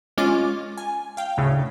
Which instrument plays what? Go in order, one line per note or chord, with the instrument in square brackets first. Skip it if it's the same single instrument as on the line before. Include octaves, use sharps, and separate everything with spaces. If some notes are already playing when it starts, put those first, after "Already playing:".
[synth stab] G#3 C#4 F4 D6 F6 A6
G#5
F5 G5
D2 A2 C#3